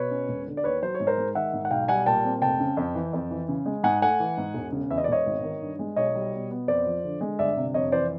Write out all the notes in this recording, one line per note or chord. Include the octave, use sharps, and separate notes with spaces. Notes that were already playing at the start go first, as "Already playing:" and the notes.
Already playing: B2 B4 C#5
C#4
E1
D3
D5
D#2 B4 C#5
F#3 C5
C#5
G#2
A#4 C5
G#3
D#3 E5 F#5
G#2
F#5
B1 F5 G5
G3 F#5 G#5
A#2 G5 A5
C4
F1 G5 A5
C#3
F2
E3
F2
E3
C#3
G#3
G#2 F#5 G#5
A3 F#5 G#5
E3
G#2
E1
C#3
E2 E5
D#5
D5
E1 C#5 D#5
G#1
D#3
G2
G#3
B1 C#5 D#5
G3
B2
B3
F2 C5 D5
F3
D3
G#3
G1 D5 E5
C3
F2 C#5 D#5
E3 C5 D5